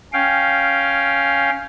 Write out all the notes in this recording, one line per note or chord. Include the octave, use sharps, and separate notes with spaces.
C#4 F5 G5